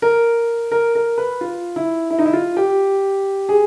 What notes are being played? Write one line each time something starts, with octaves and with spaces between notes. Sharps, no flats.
A#4
A#4
A#4
B4
F4
E4
E4
D#4
E4
F4
G4
G#4